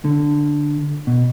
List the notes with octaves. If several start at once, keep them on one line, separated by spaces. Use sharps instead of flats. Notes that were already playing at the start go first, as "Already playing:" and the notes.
D3
B2